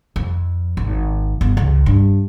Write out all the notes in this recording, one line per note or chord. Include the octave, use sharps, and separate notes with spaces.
F2
G#1
G1
C#2
G2